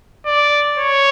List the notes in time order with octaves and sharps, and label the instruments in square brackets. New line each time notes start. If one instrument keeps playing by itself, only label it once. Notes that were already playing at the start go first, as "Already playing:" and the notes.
[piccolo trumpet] D5
C#5